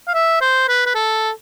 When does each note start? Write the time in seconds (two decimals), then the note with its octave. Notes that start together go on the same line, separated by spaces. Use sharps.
0.08 F5
0.14 E5
0.41 C5
0.68 B4
0.86 B4
0.95 A4